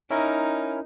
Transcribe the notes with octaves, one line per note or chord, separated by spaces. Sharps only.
C#4 D#4 E4 A#4